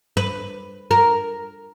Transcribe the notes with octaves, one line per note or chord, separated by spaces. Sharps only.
B4
A#4